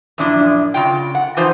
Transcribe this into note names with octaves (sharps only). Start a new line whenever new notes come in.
F#2 A#2 F3 D4 E4
C#3 F4 G5
F#5
E3 F3 D#4 F4 C5